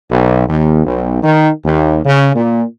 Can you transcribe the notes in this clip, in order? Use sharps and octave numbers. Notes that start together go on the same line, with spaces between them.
B1
D#2
B1
D#3
D#2
C#3
A#2